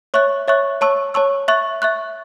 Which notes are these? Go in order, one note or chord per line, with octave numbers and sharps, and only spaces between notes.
C#5 E5 C#6 F#6
C#5 E5 C#6 F#6
C#5 A5 C#6 E6
C#5 A5 C#6 E6
E5 C#6 F#6
E5 C#6 F#6